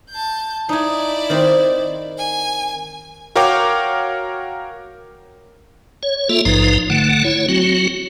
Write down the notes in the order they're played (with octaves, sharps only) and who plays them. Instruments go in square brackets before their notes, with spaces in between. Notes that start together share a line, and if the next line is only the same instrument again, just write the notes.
[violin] A5 G6
[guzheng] D#4 G#5 [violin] E4 D5
[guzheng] D#3 C4
[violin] G#5
[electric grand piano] F#4 A#4 C#5 F5 G5 D6
[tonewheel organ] C#5
A#3 F4 A4 E5
A#1 G#2 F3 D#4 B4
D3 A3 F#5
E4 C#5
F#3 C4 F#4